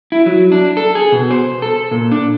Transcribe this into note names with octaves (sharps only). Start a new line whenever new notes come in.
E4
F#3
D4
A4
G#4
B2
C5
A4
A#2
D4